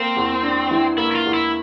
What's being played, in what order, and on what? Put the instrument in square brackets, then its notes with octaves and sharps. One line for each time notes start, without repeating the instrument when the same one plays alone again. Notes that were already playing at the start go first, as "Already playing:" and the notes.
Already playing: [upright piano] A#3 [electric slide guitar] C4
[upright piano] E2
D4
E3
[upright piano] A#3 [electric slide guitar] E4
[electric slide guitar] E4
F4
[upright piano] E2
[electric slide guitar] E4